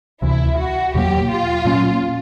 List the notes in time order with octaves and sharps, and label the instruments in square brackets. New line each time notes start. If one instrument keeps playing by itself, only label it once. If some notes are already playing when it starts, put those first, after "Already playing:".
[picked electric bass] D2 C3 E3 [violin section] E4
[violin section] F#4
[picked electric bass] E2 B2 F#3 A#3 [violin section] G4
[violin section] F4
[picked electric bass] A#2 F#3 A#3 C#4